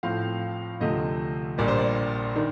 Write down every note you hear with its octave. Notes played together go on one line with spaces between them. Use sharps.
A2 F3 C4 F5
D2 C3 F3 A3 D#5
A#1 A#2 G3 D5
C5
D5
D#3 A#3 D4